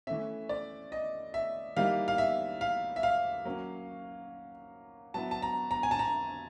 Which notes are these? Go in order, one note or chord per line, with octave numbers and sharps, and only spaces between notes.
E3 A3 C#4 E5
D5
D#5
E5
E3 G3 A#3 D#4 F5
F5
E5
F5
E5
F5
F#3 A#3 C#4
F#3 B3 E4 A5
A5
A#5
A#5
G#5
A5
A#5